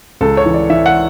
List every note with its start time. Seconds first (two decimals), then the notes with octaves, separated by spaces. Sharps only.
0.21 C#2 A4
0.37 C#5
0.46 E3
0.54 D5
0.70 E3 E5
0.86 F#5